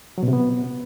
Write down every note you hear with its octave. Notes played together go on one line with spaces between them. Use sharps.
F#3
B2
C3
B3